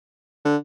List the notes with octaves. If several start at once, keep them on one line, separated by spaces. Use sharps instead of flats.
D3